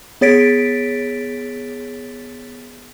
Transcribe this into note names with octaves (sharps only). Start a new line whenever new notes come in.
B3 G#4 C#5 A6 B6 D7